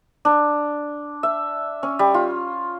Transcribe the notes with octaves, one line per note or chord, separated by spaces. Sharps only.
D4
E5
C#4
G3
F4